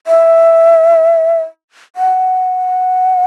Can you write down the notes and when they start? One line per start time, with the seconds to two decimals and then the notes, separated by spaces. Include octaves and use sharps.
0.07 E5
1.96 F#5